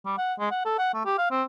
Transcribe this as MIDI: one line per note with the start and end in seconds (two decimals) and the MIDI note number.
0.06 0.14 55
0.18 0.34 78
0.39 0.50 56
0.51 0.63 78
0.65 0.77 69
0.79 0.92 78
0.94 1.01 57
1.06 1.17 67
1.18 1.31 77
1.31 1.43 60